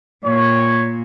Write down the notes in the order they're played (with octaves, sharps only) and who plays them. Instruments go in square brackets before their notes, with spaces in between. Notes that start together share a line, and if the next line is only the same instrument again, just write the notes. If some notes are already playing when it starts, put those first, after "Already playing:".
[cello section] A#2 [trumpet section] C#5